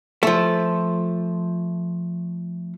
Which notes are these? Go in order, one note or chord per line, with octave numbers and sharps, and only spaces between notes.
F3 A3